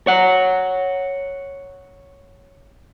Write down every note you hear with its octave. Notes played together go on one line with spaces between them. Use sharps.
C#5 F#5